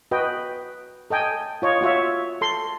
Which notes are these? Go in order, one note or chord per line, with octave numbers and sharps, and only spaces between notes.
F#4 B4 D#5 G5
A4 D#5 G5 G#5
F4 C#5 D#5
F4 F#4 C#5 E5
A4 C6